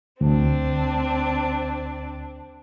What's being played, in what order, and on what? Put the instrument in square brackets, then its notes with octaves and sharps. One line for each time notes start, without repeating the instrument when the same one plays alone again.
[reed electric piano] D2 [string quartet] C4 D4